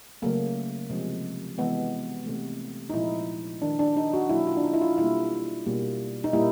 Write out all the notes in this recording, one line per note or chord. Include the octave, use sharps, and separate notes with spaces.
C#3 F#3 A3 A#3
C3 F3 G#3
C3 E3 G#3 B3
C3 E3 A3
D#4
A#2 F3 G#3 E4
D#3 G#3 D4
D4
D#4
F#4
B2 F#3 A#3 E4
F4
D4
D#4
E4
F4
B2 G3 A#3 E4
B2 G3 A#3
D#4
A#2 G3 A#3 E4